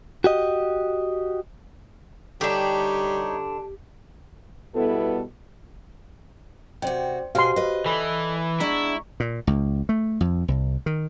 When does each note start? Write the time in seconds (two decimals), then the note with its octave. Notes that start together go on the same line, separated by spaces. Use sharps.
0.24 F#4 G4 D#5
2.41 D3 G3 D4 D#4 G4 C#5
4.75 B2 G3 B3 E4 A4
6.82 C3 F#4 C5 D5 G5
7.35 B2 F#4 G4 C5 F5 G#5 C6
7.56 B4 D#5
7.86 E3 A4 D5 B5
8.60 G#3 B3 D4 E4 A#5 C#6
9.20 A#2
9.47 C#2
9.89 A3
10.21 F2
10.48 C2
10.86 D#3